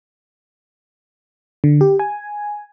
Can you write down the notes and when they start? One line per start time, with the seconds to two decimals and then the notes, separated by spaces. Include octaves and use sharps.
1.64 D3
1.81 G4
1.99 G#5